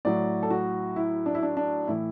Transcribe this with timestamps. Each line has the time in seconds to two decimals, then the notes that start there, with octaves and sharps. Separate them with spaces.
0.05 A2 F#3 D5
0.43 A4
0.50 F#4
0.96 E4
1.26 D4
1.35 E4
1.43 D4
1.57 D4
1.87 A2 E3 E4